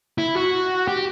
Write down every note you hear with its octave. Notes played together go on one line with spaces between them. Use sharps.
E4
F#4
G4